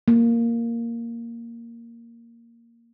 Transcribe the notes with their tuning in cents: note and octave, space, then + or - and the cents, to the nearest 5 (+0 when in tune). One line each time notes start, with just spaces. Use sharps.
A#3 -5